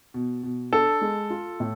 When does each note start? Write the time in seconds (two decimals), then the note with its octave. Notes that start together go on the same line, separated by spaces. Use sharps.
0.14 B2
0.43 B2
0.72 D4 A4
1.01 G#3
1.30 F4
1.60 A2